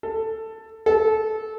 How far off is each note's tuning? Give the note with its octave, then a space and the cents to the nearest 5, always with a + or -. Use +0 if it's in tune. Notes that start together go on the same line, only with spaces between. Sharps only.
A4 +10
A4 -20